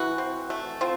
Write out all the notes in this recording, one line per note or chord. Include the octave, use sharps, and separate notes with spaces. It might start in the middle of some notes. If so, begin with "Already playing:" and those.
Already playing: E3 F#4
C4
A3
C4 F4